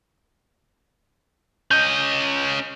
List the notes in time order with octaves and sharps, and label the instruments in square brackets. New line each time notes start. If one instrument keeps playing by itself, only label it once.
[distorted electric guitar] C#4 D#5 [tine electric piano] G6